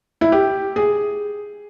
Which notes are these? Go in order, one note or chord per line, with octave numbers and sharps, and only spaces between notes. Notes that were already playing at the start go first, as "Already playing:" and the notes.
E4
G4
G#4